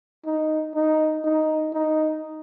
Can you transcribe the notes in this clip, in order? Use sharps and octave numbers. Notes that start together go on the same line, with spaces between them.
D#4
D#4
D#4
D#4